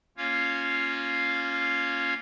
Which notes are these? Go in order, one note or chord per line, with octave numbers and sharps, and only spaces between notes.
A#3 C#4 F4 C#5 F5